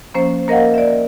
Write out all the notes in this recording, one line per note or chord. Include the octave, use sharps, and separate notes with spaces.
F3 A#3 C#4 C5
A#3 A#4 D#5 F5 F#5
D5 E5